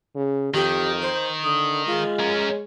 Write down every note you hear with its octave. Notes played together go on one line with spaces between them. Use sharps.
C#3
F2 D#3 G4
C5
D3 D#6
G#3 F4
C#4 A#4